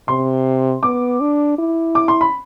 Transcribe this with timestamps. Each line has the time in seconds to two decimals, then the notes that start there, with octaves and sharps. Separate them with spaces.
0.08 C3 C6
0.83 B3 D6
1.20 D4
1.58 E4
1.95 D6
2.08 C6
2.21 B5